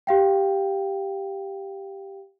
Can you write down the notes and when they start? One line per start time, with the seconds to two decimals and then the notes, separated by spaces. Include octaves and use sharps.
0.07 G4 F5 G5